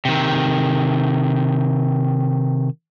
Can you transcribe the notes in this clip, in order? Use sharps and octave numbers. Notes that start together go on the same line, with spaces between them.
C3 D#3